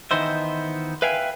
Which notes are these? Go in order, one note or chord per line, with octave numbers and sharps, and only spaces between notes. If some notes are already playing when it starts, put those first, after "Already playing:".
D#3 E3 B3 D#4 C5 E5
B4 E5 F5 G5 G#5